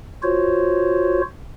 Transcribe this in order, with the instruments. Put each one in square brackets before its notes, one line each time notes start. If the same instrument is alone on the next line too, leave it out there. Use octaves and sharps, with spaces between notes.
[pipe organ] F4 F#4 C5 C#5